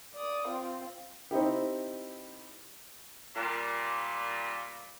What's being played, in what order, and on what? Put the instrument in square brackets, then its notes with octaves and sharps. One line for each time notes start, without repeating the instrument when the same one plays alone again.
[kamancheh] D5 D#6
C4 F4
[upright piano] C4 D#4 E4 G4
[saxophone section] A#2 G3